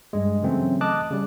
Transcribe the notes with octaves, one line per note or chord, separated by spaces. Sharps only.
G2 G3 G#3
C#3 E3 F#3 A3 C4 C#4
D#5 A5 D6 D#6 F#6
C#3 G3